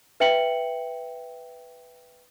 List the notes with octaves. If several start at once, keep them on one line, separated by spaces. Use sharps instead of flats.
B4 E5 G5 C#7 F#7